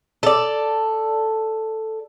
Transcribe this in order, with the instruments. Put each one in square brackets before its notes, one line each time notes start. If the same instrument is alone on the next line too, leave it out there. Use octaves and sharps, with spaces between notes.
[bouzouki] A4 D5